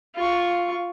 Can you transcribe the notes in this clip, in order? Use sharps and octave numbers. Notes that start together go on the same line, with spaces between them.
F4 C#6